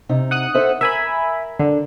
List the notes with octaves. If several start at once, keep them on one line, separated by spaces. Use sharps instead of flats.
C3 D#4
F#5 D#6 F#6
A4 C5 E5
A#4 E5 G#5 B5
D3